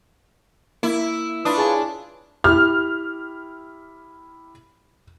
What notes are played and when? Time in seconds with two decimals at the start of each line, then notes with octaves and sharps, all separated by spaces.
0.83 A#3 E4
1.45 D4 F4 B4 C#5 D#6
1.58 G#4 G#5 A5
2.44 E4 G4 F6